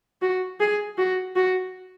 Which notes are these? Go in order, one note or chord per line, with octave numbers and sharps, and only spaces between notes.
F#4
G#4
F#4
F#4